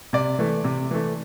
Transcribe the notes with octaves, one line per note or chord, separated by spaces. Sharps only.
C3 D5
E3 A3
C3
E3 A3